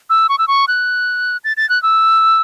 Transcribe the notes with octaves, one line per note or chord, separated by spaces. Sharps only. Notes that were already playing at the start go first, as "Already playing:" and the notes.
E6
C#6
E6
C#6
F#6
A6
A6
F#6
E6